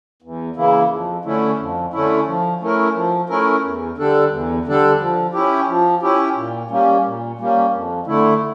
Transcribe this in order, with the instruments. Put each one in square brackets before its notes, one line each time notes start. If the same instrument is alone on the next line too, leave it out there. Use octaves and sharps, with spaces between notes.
[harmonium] E2
C#3 E3 A#3 E4
F2
D3 A3 C#4 E4
F2
D3 A3 C#4 E4
F3
A3 C#4 E4 A#4
F3
A3 C#4 E4 A#4
E2
D3 G3 D4 A4
E2
D3 G3 D4 A4
F3
C#4 E4 G4
F3
C#4 E4 G4
A#2
G3 A#3 C#4
A#2
G3 A#3 C#4
F2
D3 A3 E4